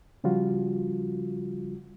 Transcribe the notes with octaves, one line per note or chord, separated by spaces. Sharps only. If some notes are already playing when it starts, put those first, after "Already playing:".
C#3 F3 G3 F4 F#4